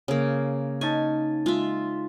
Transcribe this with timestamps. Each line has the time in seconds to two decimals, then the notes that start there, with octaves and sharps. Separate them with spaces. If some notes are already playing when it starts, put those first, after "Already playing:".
0.08 C#3 A#3
0.81 C#4 D#4 G#5 A5
1.46 G#3 F4 E5